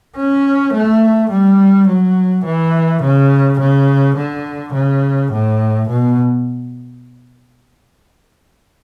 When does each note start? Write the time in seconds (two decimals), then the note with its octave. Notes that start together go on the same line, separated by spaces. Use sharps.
0.17 C#4
0.73 A3
1.30 G3
1.88 F#3
2.45 E3
3.02 C#3
3.60 C#3
4.16 D3
4.73 C#3
5.32 A2
5.89 B2